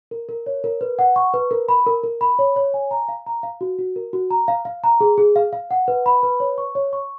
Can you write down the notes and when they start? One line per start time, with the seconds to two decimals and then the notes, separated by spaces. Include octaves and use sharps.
0.11 A#4
0.29 A#4
0.46 C#5
0.64 A#4
0.81 B4
0.99 F#5
1.16 C#6
1.34 B4
1.51 A#4
1.69 B5
1.86 A#4
2.03 A#4
2.21 B5
2.39 C#5
2.56 C#5
2.74 G#5
2.91 A#5
3.09 F5
3.26 A#5
3.43 F5
3.61 F#4
3.79 F#4
3.96 A#4
4.13 F#4
4.31 A#5
4.48 F5
4.65 F5
4.84 A#5
5.01 G#4
5.18 G#4
5.36 F5
5.53 F5
5.71 F#5
5.88 B4
6.06 B5
6.23 B4
6.40 C#5
6.58 C#6
6.75 C#5
6.93 C#6